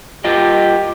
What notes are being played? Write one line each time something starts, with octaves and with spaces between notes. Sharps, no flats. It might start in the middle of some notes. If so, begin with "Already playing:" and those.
F4 G4 A#4 D#5